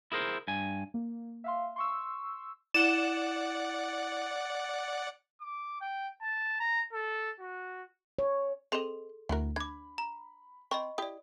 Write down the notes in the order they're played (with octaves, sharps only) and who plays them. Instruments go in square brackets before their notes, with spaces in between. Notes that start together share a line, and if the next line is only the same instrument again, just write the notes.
[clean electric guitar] E4 G#4 A#4 C5
G2 G#5
[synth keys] A#3
E5 F5 C6
C6 C#6 E6
[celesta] E4 G7 [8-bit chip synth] D5 F#5 [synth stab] E7
[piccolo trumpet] D6
G5
A5
A#5
A4
F#4
[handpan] C#5
[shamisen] C4 D#5 [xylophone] G#4 A4 C6
[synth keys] D2 [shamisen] E4 F#4 A#4
[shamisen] D4 [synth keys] B5 [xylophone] D6 G#6
[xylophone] A#5
[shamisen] C4 [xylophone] D#5 B5 C#6
[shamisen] E4 G4 [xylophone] D5 D#6